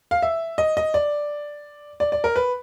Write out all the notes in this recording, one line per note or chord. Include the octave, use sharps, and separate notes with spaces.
F5
E5
D#5
D#5
D5
D5
D5
A#4
B4